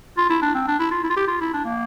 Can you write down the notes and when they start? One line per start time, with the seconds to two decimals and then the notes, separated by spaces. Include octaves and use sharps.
0.18 F4
0.30 E4
0.42 D4
0.55 C4
0.68 D4
0.79 E4
0.91 F4
1.04 E4
1.10 F4
1.17 G4
1.28 F4
1.41 E4
1.54 D4
1.65 A#3